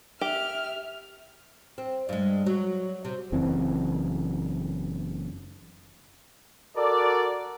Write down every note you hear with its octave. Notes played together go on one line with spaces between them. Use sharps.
G4 E5 F6
C4
G2 G#3
F#3
C3
F#1 F#2 E3 C4
F#4 A4 A#4 D5